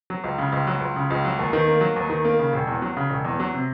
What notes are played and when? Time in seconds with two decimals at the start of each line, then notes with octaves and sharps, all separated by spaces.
0.10 F#3
0.24 C#2
0.38 C#3
0.52 C#2
0.67 F#3
0.81 C#2
0.96 C#3
1.10 C#2
1.25 F#3
1.39 D#2
1.53 D#3
1.68 A#3
1.81 F#3
1.96 D#2
2.10 D#3
2.25 A#3
2.39 C#3
2.53 E1
2.67 E2
2.82 F#3
2.97 C#3
3.10 E1
3.24 E2
3.40 F#3
3.54 C3